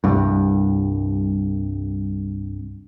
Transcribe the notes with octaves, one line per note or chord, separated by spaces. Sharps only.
C2 G2